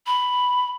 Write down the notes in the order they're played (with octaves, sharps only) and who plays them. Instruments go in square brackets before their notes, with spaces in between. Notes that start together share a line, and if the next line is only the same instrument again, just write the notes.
[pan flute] B5